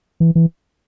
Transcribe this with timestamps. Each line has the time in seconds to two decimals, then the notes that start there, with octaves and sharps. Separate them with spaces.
0.20 E3
0.35 E3